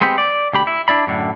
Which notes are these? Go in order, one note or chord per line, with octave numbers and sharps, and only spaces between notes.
G#3 B3 C4 G4
D5
D2 G4 B5
E4
D4 E4 D5 B5
F#2 A2 D3